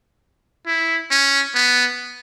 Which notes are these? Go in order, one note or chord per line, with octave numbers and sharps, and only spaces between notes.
E4
C#4
B3